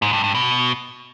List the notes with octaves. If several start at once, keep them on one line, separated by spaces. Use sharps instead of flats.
G#2
G2
G2
B2